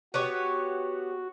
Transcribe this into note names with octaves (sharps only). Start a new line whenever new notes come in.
B3 F#4 G4 C#5